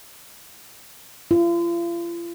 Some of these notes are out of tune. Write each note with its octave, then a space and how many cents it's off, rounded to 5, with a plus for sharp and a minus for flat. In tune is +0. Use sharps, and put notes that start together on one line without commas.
F4 -40